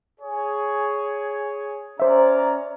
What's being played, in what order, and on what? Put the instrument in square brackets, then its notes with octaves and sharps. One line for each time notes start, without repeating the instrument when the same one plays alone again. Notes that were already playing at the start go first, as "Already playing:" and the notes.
[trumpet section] G#4 C#5
[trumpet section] C#4 D5 A#5 [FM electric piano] C5 E5